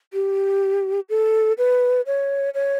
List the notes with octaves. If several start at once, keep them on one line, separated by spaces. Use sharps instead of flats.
G4
A4
B4
C#5
C#5